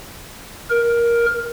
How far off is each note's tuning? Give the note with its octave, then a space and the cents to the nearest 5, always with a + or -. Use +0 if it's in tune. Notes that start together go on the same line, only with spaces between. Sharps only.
A#4 +10